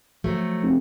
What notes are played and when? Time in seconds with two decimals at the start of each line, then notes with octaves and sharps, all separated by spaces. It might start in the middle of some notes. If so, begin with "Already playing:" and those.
0.24 F3 F#3 A3
0.63 F1